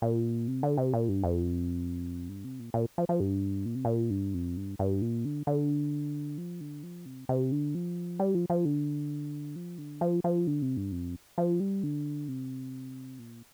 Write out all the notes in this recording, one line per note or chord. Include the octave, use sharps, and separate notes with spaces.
A#2
C3
D3
C3
A#2
G2
F2
G2
C3
A#2
A#2
F3
F3
G2
A#2
C3
A#2
G2
F2
G2
G2
A#2
D3
D3
F3
D3
F3
C3
C3
D3
F3
G3
F3
F3
D3
F3
D3
F3
F3
D3
C3
G2
F2
F3
G3
D3
C3
A#2